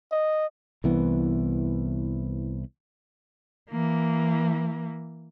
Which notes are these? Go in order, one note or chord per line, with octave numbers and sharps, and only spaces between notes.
D#5
C2 E3 B3
E3 A#3